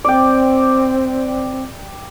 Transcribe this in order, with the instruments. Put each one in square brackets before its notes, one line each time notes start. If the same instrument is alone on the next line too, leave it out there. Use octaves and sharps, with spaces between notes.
[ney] C4 [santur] D5 G5